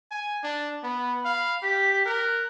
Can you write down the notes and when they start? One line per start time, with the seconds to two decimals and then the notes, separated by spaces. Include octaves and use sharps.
0.11 G#5
0.43 D4
0.83 B3 B5
1.25 F5
1.63 G4 B6
2.05 A#4 F#6